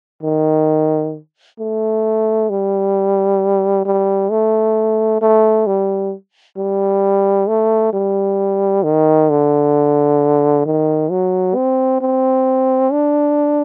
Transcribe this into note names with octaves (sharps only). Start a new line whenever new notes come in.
D#3
A3
G3
G3
A3
A3
G3
G3
A3
G3
D#3
D3
D#3
F#3
C4
C4
D4